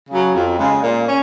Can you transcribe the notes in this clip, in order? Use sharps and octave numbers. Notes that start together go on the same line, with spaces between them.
C#3 F#3
F2
C#3 G#3
A#2
C#4